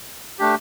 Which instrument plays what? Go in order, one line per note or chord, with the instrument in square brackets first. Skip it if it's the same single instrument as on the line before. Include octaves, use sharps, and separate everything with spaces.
[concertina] A3 D4 G4